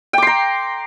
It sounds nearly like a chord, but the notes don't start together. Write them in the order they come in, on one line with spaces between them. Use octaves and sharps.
G5 D6 C6 A#5